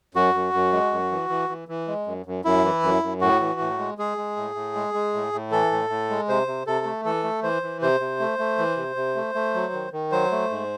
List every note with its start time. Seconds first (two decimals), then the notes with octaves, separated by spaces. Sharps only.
0.15 F#2 F#4
0.34 F#2
0.54 F#2
0.73 G#3
0.91 F#2
1.12 E3
1.30 E3
1.49 E3
1.68 E3
1.88 G#3
2.07 F#2
2.26 F#2
2.45 F#2 E4
2.65 E3
2.83 F#2
3.03 F#2
3.21 A2 F#4
3.40 E3
3.60 A2
3.79 G#3
3.98 G#3 G#4
4.17 G#3
4.37 A2
4.55 A2
4.75 G#3
4.94 G#3
5.14 A2
5.33 A2
5.52 E3 A4
5.71 A2
5.90 A2
6.10 G#3
6.28 C3 C5
6.47 C3
6.67 C3 A4
6.85 A3
7.05 E3 A4
7.23 A3
7.43 E3 C5
7.62 E3
7.82 C3 C5
8.00 C3
8.20 A3
8.39 A3
8.58 E3
8.77 C3
8.96 C3
9.15 A3
9.35 A3
9.54 F#3
9.73 D#3
9.92 D#3
10.12 F#3 C5
10.31 A3
10.50 G#2